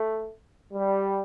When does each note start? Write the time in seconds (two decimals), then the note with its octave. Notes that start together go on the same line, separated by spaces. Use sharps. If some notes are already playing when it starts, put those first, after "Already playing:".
Already playing: A3
0.73 G3